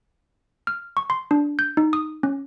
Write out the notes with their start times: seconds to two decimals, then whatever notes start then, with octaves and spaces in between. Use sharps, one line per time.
0.67 F6
0.97 C#6
1.10 C6
1.31 D4
1.59 G6
1.77 D#4
1.93 D#6
2.23 C#4